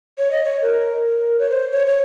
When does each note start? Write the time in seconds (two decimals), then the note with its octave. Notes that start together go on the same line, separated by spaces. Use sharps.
0.18 C#5
0.31 D#5
0.44 C#5
0.62 A#4
1.06 A#4
1.39 C#5
1.50 C5
1.72 C#5
1.87 C#5